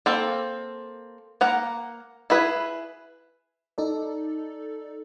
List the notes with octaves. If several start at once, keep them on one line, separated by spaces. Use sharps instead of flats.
A#3 C4 A4
A#3 F#5 A#5
E4 G#4 B4
D#4 A4 D5